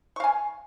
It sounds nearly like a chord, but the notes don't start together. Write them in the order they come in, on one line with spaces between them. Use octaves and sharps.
C#6 F5 G#5